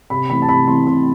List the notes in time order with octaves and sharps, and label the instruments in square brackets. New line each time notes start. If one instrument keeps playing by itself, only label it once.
[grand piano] C3 B5
E3 A3 C4 B5
A5
C3 B5
E3 A3 C4 C6
C3 C6